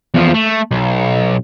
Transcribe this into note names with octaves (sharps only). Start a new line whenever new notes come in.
E2 F3
A3
B1